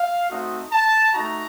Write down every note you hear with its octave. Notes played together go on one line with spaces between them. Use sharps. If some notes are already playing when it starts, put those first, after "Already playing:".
Already playing: F5
A3 C4 D#4 F#4
A5
A3 D#4 F#4 A#5